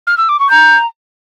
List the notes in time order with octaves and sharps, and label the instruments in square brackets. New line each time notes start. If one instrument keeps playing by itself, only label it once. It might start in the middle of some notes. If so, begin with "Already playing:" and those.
[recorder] F6
E6
D6
C#6
[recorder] A#5 [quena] G6